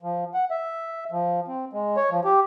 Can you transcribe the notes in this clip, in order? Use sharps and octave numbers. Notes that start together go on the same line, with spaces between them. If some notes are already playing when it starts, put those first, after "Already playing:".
F3
F#5
E5
F3
C4
G#3
C#5
F3
G4